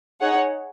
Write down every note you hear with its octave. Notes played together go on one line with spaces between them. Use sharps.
D#4 G#4 C#5 F#5